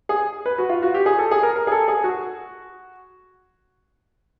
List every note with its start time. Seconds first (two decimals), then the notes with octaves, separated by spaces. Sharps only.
0.09 G#4
0.46 B4
0.58 F#4
0.69 F4
0.82 F#4
0.94 G4
1.06 G#4
1.19 A4
1.31 G#4
1.43 A#4
1.56 A#4
1.67 G#4
1.72 A4
1.88 G#4
2.04 F#4